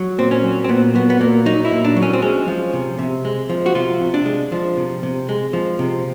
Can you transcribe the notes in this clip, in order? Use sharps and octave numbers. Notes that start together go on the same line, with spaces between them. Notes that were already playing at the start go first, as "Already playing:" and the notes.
Already playing: F#3
A#2 C4
C#4
F#3
C4
A#2 B3
F#3 B3
B3
A#2 A#3
F#3 D#4
E4
A#2
D4
F#3
C#4
C4
G#3 C#4
F3
C3
C3
G#3
F3
F#4
C3 F4
C3
D4
G#3
F3
C3
C3
G#3
F3
C3